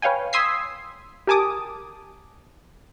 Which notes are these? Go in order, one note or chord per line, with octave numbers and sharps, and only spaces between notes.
B4 C#5 F5 G5 G#5
C6 D#6 E6 G#6 B6 C7
G4 A#4 G#5 A5 D6 D#6